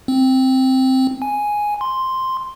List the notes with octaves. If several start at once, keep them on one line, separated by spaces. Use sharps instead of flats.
C4
G#5
C6